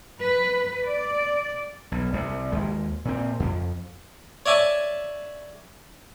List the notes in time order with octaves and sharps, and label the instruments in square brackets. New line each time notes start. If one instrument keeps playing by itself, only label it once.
[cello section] B4
D5
[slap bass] B1
C2
D#2 G#3
A#2 C4
F2
[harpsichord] C#5 D5 E5 G#5 A5